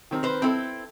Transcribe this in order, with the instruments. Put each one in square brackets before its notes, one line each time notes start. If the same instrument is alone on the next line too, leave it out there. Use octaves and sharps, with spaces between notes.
[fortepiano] D#3 C4 A#4
[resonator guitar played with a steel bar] B4 C5
[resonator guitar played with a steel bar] C4 E4 [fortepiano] A4 G5